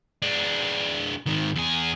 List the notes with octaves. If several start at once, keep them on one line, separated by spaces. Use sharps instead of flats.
G#3 D4
G#2 D#3
E2 G#4